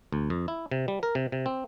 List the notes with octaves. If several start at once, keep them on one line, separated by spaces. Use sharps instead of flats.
D2
F2
E4
C3
G3
A#4
C3
C3
C4